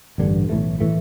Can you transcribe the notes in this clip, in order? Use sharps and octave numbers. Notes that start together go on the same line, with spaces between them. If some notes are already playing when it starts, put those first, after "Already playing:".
A1 G2 D3
B1 A2 E3 A3
A2 E3 A3